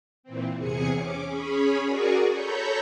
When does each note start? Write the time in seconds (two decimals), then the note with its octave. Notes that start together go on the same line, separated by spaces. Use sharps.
0.23 A#2 E3 C4
0.57 E2 C3 G#4 G#5 C#7
0.94 C#4 D6
1.25 C#4 G#4 C#5 B5
1.83 F#4 G#4 A#4 D5 G#5 C#6
2.31 A4 C#5 A#5 B5 C#6 G6